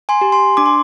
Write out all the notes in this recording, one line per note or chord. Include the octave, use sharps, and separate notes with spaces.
G#5 C6
G4
G#5 C6
D4 D6
C6